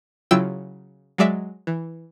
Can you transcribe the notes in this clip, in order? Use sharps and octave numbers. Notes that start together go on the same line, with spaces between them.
C#3 F#3 E4 F4 G5 E6
F#3 G#3 D5 E5
E3